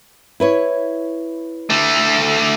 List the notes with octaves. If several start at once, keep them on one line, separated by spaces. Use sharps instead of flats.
E4 B4 C#5
D3 A3